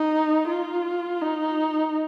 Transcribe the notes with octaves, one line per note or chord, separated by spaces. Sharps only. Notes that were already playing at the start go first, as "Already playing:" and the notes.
Already playing: D#4
F4
D#4